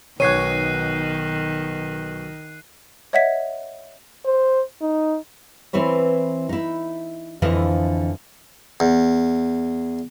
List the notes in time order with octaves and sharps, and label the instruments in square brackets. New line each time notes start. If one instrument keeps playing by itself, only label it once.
[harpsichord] B1 B2 [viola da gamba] D#3 [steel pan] C#5 [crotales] F#6 C7 D#7
[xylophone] C#5 D#5 E5 F#5 G#6 B6
[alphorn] C5
D#4
[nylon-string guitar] E3 C4 E4 B4 C#5
D#4 E4
F2 D3 E3 F3 E4 D#5
[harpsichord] E2